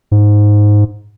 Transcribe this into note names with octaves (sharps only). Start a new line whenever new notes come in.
G#2